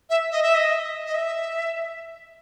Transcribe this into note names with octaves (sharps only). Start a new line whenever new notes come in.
E5
D#5
E5
D#5
D#5
E5